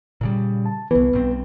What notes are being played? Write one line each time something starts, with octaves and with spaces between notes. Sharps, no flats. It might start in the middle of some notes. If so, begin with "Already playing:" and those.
A#2 C#3 G3
A5
C2 E3 B3 B4
B1 G2 C4